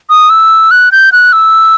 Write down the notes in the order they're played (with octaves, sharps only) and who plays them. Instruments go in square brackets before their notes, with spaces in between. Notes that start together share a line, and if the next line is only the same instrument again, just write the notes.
[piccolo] D#6
E6
F#6
G6
F#6
E6